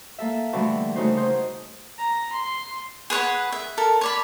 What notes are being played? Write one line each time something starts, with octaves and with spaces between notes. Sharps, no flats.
A#3 A4 E5
B2 D3 E3 G3 A3 B3
C#3 A3 D#4 F#4 A#4 C5
D#4 G#4 A#4 C5
A#5
C6
G#4 B4 C#5 F#5
E5
A4 A#4
C#5 D5 B5